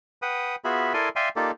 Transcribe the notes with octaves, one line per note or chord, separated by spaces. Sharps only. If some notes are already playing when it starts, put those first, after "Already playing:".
B4 F#5 G5 D#6
B3 F4 F#4 G#4 E5 B5
E4 A4 A#4 D5 G#5 C6
D5 E5 F5 G5 G#5 C6
A#3 D#4 F4 G4 A4 D5